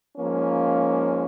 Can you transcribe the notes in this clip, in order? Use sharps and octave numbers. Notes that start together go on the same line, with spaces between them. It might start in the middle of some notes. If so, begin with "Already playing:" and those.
G#2 F3 A#3 C#4